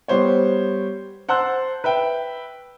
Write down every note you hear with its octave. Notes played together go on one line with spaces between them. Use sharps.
G3 B3 C5 C#5
C5 F#5 A5 C6 E6 F#6
B4 E5 G5